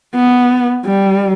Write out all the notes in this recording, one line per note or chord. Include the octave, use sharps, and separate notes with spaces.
B3
G3